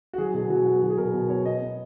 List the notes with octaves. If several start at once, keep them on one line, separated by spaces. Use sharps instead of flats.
F#4
F#3 G#4
B2 G#4
F#3 F#4
B3 F#4
F#3 F#4
G#4
B2 A#4
B2
B3 C#5
B3 D#5
B3